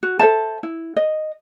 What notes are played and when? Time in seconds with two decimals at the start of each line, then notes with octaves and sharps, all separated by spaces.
0.03 F#4
0.19 A4 C5 E5 A5
0.63 E4
0.96 D#5